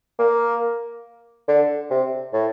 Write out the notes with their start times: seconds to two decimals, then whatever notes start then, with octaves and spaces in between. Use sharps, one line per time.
0.19 A#3
1.48 D3
1.90 C3
2.33 A2